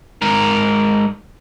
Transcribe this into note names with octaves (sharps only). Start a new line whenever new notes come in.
G#2 A#4